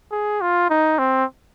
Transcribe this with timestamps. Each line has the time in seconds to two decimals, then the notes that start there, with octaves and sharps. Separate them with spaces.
0.11 G#4
0.41 F4
0.70 D#4
0.98 C4